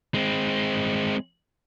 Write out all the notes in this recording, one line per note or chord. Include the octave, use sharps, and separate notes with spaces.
G#3 C4